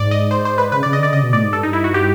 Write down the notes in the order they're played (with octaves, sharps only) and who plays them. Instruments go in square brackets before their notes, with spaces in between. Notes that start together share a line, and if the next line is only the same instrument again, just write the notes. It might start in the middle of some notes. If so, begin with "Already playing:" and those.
Already playing: [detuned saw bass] G#2 [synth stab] D5
[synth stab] D#5
C5
C5
B4
[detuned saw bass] C#3 [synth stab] B4
[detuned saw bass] C#3 [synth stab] D5
[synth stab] D#5
[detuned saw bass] D3 [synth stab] D5
[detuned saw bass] C#3 [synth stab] D#5
[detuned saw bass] B2
[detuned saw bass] A2 [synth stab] D5
[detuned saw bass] G#2
[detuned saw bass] G2 [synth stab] A4
[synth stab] D#4
E4
F#4
G4